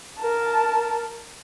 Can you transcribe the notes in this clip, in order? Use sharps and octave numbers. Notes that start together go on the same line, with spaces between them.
A#4 A5